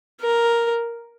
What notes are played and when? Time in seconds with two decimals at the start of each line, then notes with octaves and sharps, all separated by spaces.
0.21 A#4